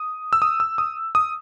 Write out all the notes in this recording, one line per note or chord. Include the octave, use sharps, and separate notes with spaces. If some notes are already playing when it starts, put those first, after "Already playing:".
Already playing: D#6
E6
D#6
E6
D#6
D#6